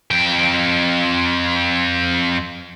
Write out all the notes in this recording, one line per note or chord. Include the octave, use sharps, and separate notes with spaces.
F2 G5